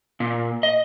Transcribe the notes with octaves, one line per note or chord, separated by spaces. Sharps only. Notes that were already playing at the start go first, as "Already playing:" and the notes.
A#2
D#5